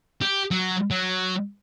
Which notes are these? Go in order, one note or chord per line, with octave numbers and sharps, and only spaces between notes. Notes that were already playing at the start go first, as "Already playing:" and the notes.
G4
F#3
F#3